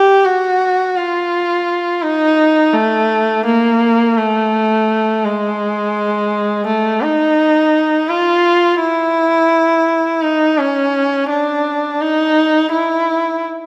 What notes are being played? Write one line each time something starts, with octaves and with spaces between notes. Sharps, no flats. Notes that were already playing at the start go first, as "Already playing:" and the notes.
Already playing: G4
F#4
F4
D#4
A3
A#3
A3
G#3
A3
D#4
F4
E4
D#4
C#4
D4
D#4
E4